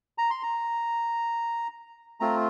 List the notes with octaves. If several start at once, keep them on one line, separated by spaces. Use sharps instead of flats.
A#5
C6
A#5
A3 C4 F4 A#5